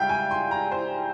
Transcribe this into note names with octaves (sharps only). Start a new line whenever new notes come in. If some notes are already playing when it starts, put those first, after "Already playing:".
Already playing: C#2 C#3 G3 E5 F5 G5
G#5
C6
A#5
C5